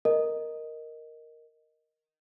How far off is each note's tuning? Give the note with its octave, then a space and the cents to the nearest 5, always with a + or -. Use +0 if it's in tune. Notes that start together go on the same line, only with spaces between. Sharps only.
A#4 +0 D#5 +0